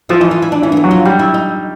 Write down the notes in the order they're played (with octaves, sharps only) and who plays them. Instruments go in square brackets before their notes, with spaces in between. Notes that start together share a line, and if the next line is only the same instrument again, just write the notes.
[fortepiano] F3 [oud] E4
[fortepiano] E3 [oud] D#4
[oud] F4
E4
D4
[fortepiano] E3 [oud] C#4
[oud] A#3
B3
[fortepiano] F#3
[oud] F4
[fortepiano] G3 [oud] F#4
[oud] E4
D#4